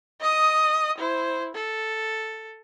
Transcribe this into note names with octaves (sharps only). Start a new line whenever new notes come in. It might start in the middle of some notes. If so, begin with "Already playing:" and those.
D#5 D#6
E4 C5
A4